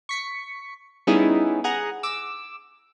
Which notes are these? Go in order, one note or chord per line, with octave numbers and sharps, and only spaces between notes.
C#6 B6 C#7
G3 B3 C#4 D#4 E4 G#4
G#4 F#5 A#5
D6 E6